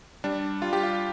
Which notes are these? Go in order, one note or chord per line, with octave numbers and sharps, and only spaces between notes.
G3 D4
G3 F4
G4
F4